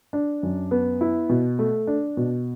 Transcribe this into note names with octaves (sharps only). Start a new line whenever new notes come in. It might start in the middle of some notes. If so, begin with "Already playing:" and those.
D4
F#2
B3
E4
B2
A3
D4
B2